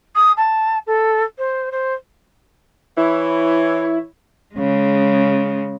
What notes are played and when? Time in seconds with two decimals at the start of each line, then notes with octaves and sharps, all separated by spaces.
0.16 D#6
0.37 A5
0.87 A4
1.38 C5
1.72 C5
2.97 E3 E4 C#5
4.55 C#3 G#3